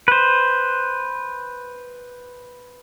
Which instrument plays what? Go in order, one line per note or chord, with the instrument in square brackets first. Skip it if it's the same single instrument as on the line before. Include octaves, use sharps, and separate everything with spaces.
[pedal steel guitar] B4 C5